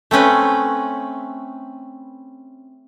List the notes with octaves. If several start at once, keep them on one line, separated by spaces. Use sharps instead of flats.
A3 C4 C#4 B4